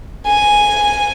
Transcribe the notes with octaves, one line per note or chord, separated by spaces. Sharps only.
G#5